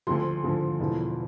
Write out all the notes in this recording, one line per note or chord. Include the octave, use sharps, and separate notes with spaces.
D2 D3 F3 C6
D2 D3 F3
E1 E2 D3 F3